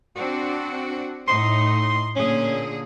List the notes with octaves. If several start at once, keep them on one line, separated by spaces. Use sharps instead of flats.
C4 D4 F#4
A2 D#4 C6
A#2 D3 C#4 G#4